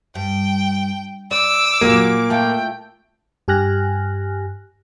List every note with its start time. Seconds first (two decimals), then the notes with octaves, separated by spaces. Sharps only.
0.15 G2 G5
1.31 D5 D6 E6
1.81 A#2 F#3 A#3 G4
2.30 A3 E4 F4 G5
3.48 G2 G4 G#5 F6 F#6 A#6